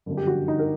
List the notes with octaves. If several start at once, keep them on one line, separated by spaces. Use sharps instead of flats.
G1 F#2 D3
G4
F#4
D#4
A#4